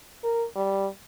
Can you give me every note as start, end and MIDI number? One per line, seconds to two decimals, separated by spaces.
0.24 0.45 70
0.56 0.87 55